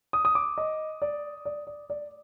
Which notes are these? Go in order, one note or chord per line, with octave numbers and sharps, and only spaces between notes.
D#6
D#6
D6
D#5
D5
D5
D5
D5